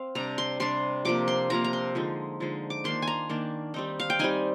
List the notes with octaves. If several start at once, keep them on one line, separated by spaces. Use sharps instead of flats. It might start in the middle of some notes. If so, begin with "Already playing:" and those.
Already playing: C4 F5
C3 G3 D4 A#5
C6
C3 G3 D4 C6
C3 F3 A#3 D6
C6
C3 F3 A#3 A#5
A#5
C6
D3 F3 G#3 D#4
D3 F3 G#3 D#4
D6
D#3 A#3 D4 C6
G#5
A#5
D#3 A#3 D4
G3 C4 D#4
F5
G5
G3 C4 D#4 G#5